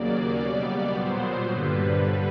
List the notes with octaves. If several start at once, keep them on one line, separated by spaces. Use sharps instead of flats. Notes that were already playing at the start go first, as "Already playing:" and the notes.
Already playing: D#2 C#3 F#3 A#3 D5
B2 G3 B3 D5
A#2 F#3 B3 C5
G2 D3 G3 B4